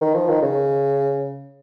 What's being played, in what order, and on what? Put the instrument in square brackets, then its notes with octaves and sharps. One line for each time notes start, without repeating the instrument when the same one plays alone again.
[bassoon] D#3
F3
D#3
C#3